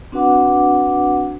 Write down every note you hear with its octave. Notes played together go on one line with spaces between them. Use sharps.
C4 D4 F#4 B4 F#5 D6